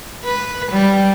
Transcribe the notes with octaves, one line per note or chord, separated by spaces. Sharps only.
B4
G3